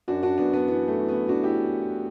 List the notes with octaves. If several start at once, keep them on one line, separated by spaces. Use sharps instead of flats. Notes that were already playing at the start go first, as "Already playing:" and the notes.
F#2 D4 F#4
D4 F#4
F#2 B3 D4
B3 D4
E3 B3
A3
E3
B3
E3 D4 F#4
E4 G4